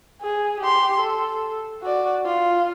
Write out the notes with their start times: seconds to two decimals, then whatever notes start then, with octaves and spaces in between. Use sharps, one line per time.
0.22 G#4
0.60 G4 C6
1.00 A4
1.83 F#4 D5
2.25 F4